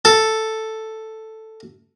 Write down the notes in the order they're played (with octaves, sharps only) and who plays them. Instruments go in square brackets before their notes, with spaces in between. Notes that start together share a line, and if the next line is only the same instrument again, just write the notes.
[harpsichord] A4